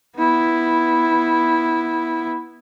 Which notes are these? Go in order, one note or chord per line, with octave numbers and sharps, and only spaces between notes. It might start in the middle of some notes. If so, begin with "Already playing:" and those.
B3 E4